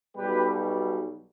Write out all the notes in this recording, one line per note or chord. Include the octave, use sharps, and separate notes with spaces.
B1 B2 G3 G4 B4